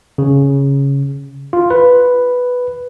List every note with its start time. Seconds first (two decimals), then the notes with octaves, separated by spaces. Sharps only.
0.18 C#3
1.53 F4
1.70 B4